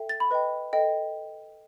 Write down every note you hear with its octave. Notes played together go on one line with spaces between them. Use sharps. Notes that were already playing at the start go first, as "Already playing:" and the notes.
Already playing: A4 E5 G5
A6
B5
B4 D#5 G5
A4 D#5 G5